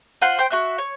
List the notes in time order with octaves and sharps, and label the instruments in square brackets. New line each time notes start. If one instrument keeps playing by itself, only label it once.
[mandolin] F4 C5 F#5 C6
C5 G5
F#4 E5 F#6
C#5